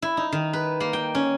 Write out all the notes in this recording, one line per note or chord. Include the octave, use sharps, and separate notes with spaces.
E4
D#4
D#3
B4
A#3
G5
C#4